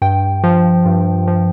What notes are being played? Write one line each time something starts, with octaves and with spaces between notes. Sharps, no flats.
G2 G5
F3
G2
F3